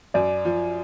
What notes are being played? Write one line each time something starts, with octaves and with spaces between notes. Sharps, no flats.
F#2 D5
F3